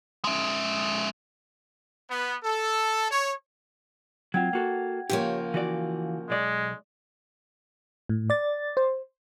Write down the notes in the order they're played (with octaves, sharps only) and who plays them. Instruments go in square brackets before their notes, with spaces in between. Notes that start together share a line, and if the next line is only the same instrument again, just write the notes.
[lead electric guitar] G#3 E5
[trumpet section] B3
A4
C#5
[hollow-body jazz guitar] F#3 C4 F4 [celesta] F#5 G5 G#6
[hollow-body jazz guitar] A#3 F#4 A4
[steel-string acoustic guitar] C#3 F3 A#3 [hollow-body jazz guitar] G4 C#5
[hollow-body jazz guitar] E3 F#4 D5
[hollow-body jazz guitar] B1 D5 [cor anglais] G#3
[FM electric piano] A2
D5 A6
[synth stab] C5